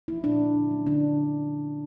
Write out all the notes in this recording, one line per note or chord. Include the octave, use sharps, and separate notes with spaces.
F3 A#3 E4
A#2 D4
F3 A#3
D3
F#3 A#3 C#4
D3 D4